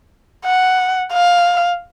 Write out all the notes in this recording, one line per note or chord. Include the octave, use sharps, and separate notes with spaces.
F#5
F5